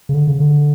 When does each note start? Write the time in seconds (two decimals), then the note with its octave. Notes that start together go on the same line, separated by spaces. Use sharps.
0.09 C#3
0.14 D3
0.27 C#3
0.40 D3